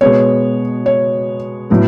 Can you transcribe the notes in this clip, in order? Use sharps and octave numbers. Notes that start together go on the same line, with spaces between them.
B2 G#3 B3 C#5
C#5
A2 F#3 B3